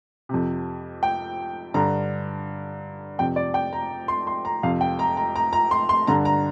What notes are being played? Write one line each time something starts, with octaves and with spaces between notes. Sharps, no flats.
F2 C3
G5
G2 D3 A#5
F2 C3 G5
D5
G5
A#5
C6
C6
A#5
F2 C3 F5
G5
A#5
A#5
A#5
A#5
C6
C6
G2 D3 A#5
A#5